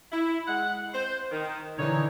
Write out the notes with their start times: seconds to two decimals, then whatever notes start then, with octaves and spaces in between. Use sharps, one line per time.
0.12 E4
0.48 G#3 F#5
0.94 C5
1.31 D#3
1.77 D3 E3 D#4 C#5